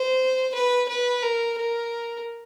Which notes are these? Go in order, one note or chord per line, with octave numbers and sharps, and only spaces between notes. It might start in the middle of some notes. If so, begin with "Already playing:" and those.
Already playing: C5
B4
B4
A#4
A#4